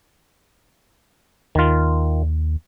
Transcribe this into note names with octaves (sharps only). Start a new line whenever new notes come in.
D#2 D#3 F4